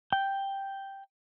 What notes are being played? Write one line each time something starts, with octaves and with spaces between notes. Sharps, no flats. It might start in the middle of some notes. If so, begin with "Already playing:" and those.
G5